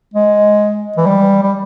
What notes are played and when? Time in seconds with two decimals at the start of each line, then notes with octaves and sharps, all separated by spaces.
0.14 G#3
0.97 E3
1.06 G3
1.43 G3